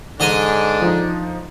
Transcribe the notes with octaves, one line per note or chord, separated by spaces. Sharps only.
G#2 D3 D4 D#5 G#5
F3 D#4